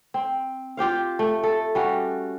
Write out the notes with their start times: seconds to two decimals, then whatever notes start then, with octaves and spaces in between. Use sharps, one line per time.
0.14 C4
0.77 F4 G4 C5 F5
1.19 A3
1.44 A4
1.75 G3 C#4 F#4